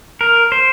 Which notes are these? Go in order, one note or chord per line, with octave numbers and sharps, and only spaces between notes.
A#4
C5